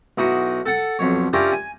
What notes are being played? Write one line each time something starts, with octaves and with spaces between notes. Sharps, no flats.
B1 D#4 E4 F#4
A4 F#5 A5
B1 F2 C#5
C#4 D4 E4 F4 G4 A#4
G#5